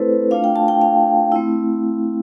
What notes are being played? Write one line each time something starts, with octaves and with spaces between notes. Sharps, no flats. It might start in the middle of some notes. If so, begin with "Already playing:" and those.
Already playing: A3 C4 E4 A4 B4 C5
A3 D4 F4 F5
G5
A5
G5
F5
A3 C4 E4